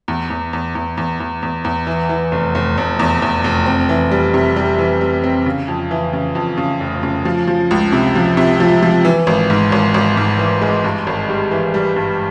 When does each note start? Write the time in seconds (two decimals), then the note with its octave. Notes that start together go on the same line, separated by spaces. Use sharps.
0.08 E2
0.30 E2
0.53 E2
0.75 E2
0.97 E2
1.20 E2
1.43 E2
1.65 E2
1.87 E3
2.09 E3
2.32 F1
2.55 F1
2.77 F1
2.99 E2
3.22 E2
3.44 F1
3.66 C4
3.89 E3
4.11 G3
4.34 C3
4.56 G3
4.79 E3
5.01 G3
5.24 C4
5.46 C#3
5.68 F2
5.91 E3
6.13 C#3
6.35 F2
6.58 C#3
6.80 F1
7.03 C#3
7.25 F3
7.47 F3
7.71 C#2
7.92 C3
8.15 F3
8.37 C3
8.60 F3
8.83 F3
9.05 E3
9.27 G#1
9.50 G#2
9.72 G#1
9.94 G#1
10.17 G#2
10.39 E3
10.62 G#3
10.84 G2
11.07 G#1
11.29 G3
11.51 E3
11.74 G3
11.96 G2